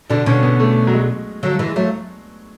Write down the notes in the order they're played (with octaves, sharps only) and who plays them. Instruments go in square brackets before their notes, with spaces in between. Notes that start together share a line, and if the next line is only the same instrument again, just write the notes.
[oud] B2 D3 [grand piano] D4
[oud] B2 D3 [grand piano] C#4
[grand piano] B3
A3
F#3
G#3
[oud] D3 F#3
E3 G#3
F#3 A3